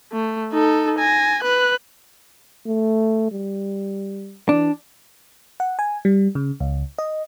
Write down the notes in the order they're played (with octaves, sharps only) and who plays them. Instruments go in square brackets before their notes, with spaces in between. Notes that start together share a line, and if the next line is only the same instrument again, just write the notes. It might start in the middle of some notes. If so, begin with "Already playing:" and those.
[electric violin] A3
D#4 A4
G#5 A#6
B4 F#6
[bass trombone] A3
G3
[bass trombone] E3 [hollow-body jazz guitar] D4
[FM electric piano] F#5
G#5
G3
C#3
C#2
D#5